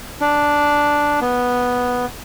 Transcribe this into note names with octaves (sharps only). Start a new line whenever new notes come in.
D4
B3